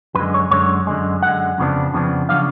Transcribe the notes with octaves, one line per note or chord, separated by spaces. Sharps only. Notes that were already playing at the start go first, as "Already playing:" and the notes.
F#2 D3 G#3 B4
C#5
F#2 D3 G#3 C#5
F#2 D3 G#3
F#2 D3 G#3 F#5
F2 C#3 F3 B3 D4
F2 C#3 F3 B3 D4
C#3 F3 B3 D4 F5